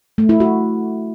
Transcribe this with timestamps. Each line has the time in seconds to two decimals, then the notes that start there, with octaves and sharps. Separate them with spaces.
0.18 A3
0.29 E4
0.40 F#4